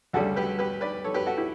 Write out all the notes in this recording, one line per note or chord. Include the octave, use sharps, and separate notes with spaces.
D2 C#3 G3 D4 F#4 A4
G4 B4
G4 B4
B4 D5
A4 C#5
G4 B4
F#4 A4
E4 G4